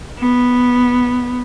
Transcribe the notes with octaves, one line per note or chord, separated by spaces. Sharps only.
B3